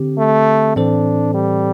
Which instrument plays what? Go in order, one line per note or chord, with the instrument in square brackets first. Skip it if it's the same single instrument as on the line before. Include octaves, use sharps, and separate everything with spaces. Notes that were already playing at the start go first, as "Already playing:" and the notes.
Already playing: [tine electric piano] D3 C4 G4
[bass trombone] A3
[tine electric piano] A2 E3 C4 A4 C5 [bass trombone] D4
[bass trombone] G3